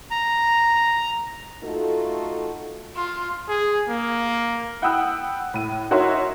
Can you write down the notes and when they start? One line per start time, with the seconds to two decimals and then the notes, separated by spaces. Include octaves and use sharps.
0.11 A#5
1.63 A3 D#4 F4 F#4 A4
2.96 F4
3.49 G#4
3.89 A#3
4.82 F#5 G5 B5 D#6 E6 F#6
5.54 A2 D#7
5.91 D#4 F#4 A#4 C#5 E5 C6